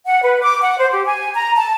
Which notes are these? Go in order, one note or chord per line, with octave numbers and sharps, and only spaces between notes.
F#5
B4
D6
F#5
C5
G4
G#5
A#5
A5